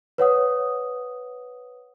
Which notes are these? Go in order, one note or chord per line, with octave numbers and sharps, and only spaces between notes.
B4 C#5 F#5 D#6